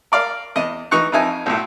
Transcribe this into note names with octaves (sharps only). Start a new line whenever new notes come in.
A#4 D5 F5
E2 D#5 D#6
E3 D#4 C#6 F#6
F2 F3 D#4 E5 G#5
B1 A2